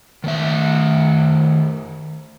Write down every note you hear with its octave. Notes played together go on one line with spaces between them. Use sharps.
D#3 A3 E5